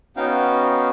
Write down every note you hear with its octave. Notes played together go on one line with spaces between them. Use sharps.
B3 C#4 D#4 F#4 F5 G5